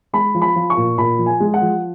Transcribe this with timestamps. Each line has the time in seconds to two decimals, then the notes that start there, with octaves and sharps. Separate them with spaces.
0.13 G#3 B5
0.35 F3
0.42 B5
0.56 F3
0.70 C#6
0.77 A#2
0.98 A#2 B5
1.18 F3
1.26 G#5
1.40 G#3
1.54 F#5
1.62 F3